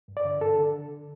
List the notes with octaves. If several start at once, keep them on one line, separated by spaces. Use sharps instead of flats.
G2
D5
D3
D3 A4
D3